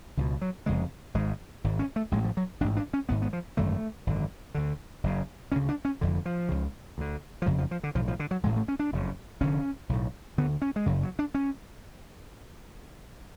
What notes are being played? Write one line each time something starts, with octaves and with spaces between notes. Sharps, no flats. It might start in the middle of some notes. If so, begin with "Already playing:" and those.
C#2 B2 D3
F#3
F1 F2 C#3 G#3
G#1 G#2 G#3
G#1 G#2
C#4
A3
A1 A2 G#3
F3
F#3
A1 G#2 D4
D4
C#4
G#1 G#2 B3
B3
F3
G#1 F#2 D3 A3
G#1 F#2 D3
D2 D3
F#1 F#2 C#3
D2 C#3 C#4
D4
C#4
F1 F2 D3
F3
C#2 C#3
D2 D3
F3
F#1 F2 C#3 F#3
F3
F3
D3
B1 A2 F3
F3
D3
F#3
A1 A2 G#3
A3
C#4
D4
F#1 F2 C#3
F1 F2 D3 C#4
B1 A2
D2 D3 B3
C#4
G#3
F#1 F#2 C#3 F#3
F#3
D4
C#4